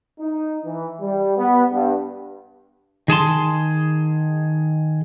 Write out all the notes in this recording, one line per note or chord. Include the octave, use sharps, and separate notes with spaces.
D#4
E3
G3
B3
G2
D#3 G#4 A5 C6